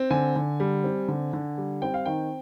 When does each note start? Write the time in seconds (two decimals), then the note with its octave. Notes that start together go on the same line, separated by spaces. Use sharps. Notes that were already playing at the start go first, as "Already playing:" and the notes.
Already playing: C4
0.11 D3 G#5
0.36 D3
0.60 G3
0.84 C4
1.08 D3
1.33 D3
1.58 G3
1.82 C4 G5
1.94 F5
2.05 D#3 G5